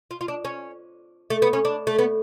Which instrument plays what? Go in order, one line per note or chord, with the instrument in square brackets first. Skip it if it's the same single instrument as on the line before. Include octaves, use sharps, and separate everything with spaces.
[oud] F4
F4
D4
C#4
A3
B3
C#4
D4
A3
B3